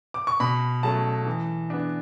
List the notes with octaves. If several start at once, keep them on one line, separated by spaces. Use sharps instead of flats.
D6
C#6
B2 B5
F#3 A3 C#4 A5
E3
B3 D4